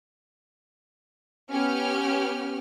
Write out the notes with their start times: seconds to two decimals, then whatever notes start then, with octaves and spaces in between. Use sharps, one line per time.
1.52 B3 C#4 G4 F6